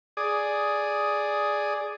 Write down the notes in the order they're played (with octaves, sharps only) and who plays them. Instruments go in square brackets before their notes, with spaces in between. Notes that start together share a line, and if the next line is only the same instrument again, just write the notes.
[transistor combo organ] G#4 D5 D#6